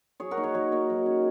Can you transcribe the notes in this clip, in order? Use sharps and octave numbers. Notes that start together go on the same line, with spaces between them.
F#3 G#4 C#5
F#4 A#4
A#3 D#4
G#4 C#5
F#3 G#4 C#5
A#3 D#4
F#3
C#4